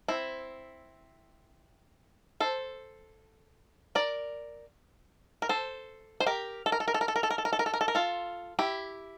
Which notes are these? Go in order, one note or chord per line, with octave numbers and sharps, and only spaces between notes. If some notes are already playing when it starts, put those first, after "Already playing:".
C4 E4
A4 C5
A#4 D5
A#4
A4 C5
C5
G4 A#4
A4
A#4
A4
A#4
A4
A#4
A4
A#4
A4
A#4
A4
A#4
A4
A#4
A4
A#4
A4
A#4
F4 A4
E4 G4